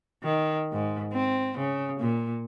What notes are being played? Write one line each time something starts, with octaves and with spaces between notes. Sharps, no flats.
D#3
G#2
C4
C#3
A#2